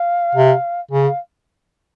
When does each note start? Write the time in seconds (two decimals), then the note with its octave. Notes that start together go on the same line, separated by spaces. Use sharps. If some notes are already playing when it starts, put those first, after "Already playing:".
Already playing: F5
0.35 C3
0.91 C#3 G#5
1.05 F5